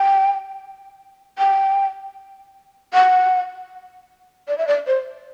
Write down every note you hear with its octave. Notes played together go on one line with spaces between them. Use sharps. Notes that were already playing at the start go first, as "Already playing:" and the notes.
Already playing: G5
G5
F#5
D5
E5
D5
C5